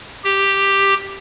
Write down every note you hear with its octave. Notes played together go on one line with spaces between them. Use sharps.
G4